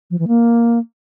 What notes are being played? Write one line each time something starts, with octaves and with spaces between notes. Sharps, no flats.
F3
E3
A#3